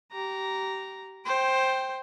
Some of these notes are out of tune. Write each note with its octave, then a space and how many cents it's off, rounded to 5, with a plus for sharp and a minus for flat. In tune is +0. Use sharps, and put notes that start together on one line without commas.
G4 -25 A#5 +0
C5 +10 G5 +0